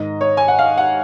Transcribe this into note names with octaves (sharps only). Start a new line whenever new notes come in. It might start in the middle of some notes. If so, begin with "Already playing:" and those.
Already playing: G#2 D#3 D#5
C#5
G#5
F#5
F5
F#5